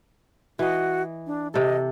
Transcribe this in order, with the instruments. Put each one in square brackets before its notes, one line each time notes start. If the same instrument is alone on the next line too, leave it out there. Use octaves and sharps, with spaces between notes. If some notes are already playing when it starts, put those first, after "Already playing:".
[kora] E3 D#5 [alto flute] F#4
[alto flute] D4
[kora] C3 A4 [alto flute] D#5